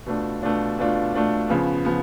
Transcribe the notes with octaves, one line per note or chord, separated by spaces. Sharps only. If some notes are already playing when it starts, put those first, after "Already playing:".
B2 A3 D4 F4
B2 A3 D4 F4
B2 A3 D4 F4
B2 A3 D4 F4
C#3 F3 B3
C#3 F3 B3